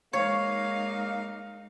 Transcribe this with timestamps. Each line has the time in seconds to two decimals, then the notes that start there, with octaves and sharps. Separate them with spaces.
0.13 G#3 A#3 D#4 C#5 F5